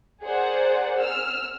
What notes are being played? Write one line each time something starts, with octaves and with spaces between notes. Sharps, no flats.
G#4 A#4 C5 D5 F#5
E6 F6